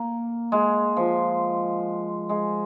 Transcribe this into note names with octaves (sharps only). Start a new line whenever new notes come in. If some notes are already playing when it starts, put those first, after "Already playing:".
Already playing: A#3
G#3
F3
G#3